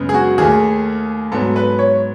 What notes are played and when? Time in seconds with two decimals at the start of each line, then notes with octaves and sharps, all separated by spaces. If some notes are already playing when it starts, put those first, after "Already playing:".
Already playing: F#2 C#3 G#3 B3
0.09 G#4
0.14 F#4
0.38 D#2 D#3 A3 G#4
1.32 G#2 F#3 B3 A4
1.56 B4
1.79 C#5